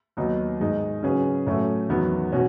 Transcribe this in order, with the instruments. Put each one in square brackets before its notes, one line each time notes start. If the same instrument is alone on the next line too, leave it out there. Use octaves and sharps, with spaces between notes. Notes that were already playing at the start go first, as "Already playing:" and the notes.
[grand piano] D#2 D#3 F#3 B3 D#4
G#2 D#3 G#3 D#4
C#3 F#3 C#4 G#4 B4
A2 F#3 A3 C#4 F#4
E2 D#3 F#3 B3
B2 F#3 C#4 F#4